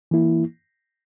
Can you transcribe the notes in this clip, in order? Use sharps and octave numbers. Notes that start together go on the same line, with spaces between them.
E3 A#3 E4